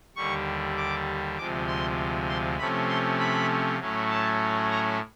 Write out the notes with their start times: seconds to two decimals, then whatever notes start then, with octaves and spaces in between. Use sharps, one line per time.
0.16 D#2 D3 G3 C#6
0.77 D6
1.38 D2 C3 F3 G#3 D6
1.68 C6
2.28 C6
2.58 C3 F3 A3 C#4 B5
2.89 C6
3.19 B5
3.79 A2 F#3 A3 C#4
4.10 A5
4.71 A#5